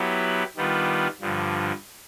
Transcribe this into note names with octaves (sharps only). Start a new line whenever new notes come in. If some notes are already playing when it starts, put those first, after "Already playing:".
Already playing: F#3 B3 E4 G4
D#3 G3 B3 D4 F4
G2 D3 F3